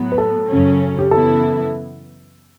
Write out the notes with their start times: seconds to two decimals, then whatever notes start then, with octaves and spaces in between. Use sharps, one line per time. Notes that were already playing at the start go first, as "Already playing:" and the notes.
Already playing: A2 F#3 B3
0.12 B4
0.18 A4
0.48 F#2 C#3 F#3 C#4
0.99 G4
1.11 F#2 C#3 E3 B3 E4 A4